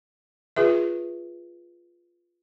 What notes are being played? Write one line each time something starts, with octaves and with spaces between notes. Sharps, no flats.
F4 G#4 B4 E5